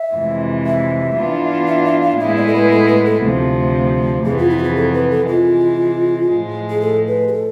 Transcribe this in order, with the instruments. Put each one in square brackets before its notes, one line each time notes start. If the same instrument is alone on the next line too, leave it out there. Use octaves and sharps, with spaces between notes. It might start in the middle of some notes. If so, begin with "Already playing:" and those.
Already playing: [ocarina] E5
[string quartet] F2 C3 E3 G#3
[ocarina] E5
[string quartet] E3 B3 D4 F4
[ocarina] E5
E5
F5
[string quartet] A2 G#3 B3 E4 G#4 [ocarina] E5
[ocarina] D5
A4
B4
A4
B4
A4
[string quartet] D2 C3 F3
[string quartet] F2 C3 E3 B3 [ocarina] G#4
[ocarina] F4
E4
F4
G#4
A4
B4
A4
[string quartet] C3 E3 G#3 [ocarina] F4
[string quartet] A2 F3 G#3
[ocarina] G#4
A4
B4
G#4
A4